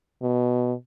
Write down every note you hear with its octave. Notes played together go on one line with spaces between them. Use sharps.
B2